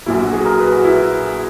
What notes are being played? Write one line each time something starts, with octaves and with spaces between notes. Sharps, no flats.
A#1 A#2 F#3 E4
F#4
G#4
A#4
B4
F#4
E4